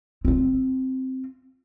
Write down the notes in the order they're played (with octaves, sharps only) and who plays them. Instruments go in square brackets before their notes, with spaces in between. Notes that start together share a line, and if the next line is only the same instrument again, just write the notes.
[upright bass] C4 F4